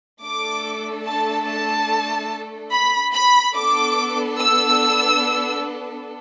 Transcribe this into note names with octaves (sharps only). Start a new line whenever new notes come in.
A3 D4 A4 D6
A5
A5
B5
B5
B3 D4 A4 D6
E6